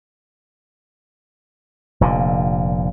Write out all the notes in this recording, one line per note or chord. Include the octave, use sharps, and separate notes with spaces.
F1 A#2 D3